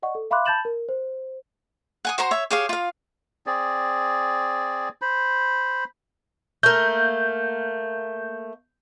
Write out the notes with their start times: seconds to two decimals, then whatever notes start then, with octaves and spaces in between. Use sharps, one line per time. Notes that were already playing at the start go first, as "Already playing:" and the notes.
0.02 D5 D#5 F#5 C#6
0.15 A4
0.31 E5 F5 B5 C6 D6 F#6
0.46 A5 B5 G6 A6 E7 F#7
0.65 A#4
0.89 C5
2.05 F#5 G#5 D#6
2.18 F#4 C5 A#5 C6
2.31 C#5 E5
2.51 G4 G#4 C#5 F5
2.69 F4 F5
3.46 C4 G#4 D5
5.02 C5 B5
6.63 A3 A#3 G6